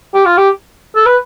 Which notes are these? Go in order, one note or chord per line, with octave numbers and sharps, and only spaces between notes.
G4
F4
G4
A4
B4